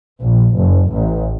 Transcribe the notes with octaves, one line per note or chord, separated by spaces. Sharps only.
A#1
F#1
A1